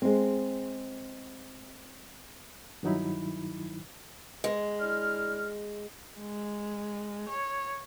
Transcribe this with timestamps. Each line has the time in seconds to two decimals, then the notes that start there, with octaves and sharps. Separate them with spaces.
0.02 G#3 C4
2.83 G2 D#3 F#3 D#4 E4 B5
4.44 G#3
4.80 D4 E4 F6
6.19 G#3
7.29 C#5